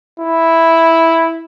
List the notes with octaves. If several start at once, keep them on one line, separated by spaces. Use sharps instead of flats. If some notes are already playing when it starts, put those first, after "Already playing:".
E4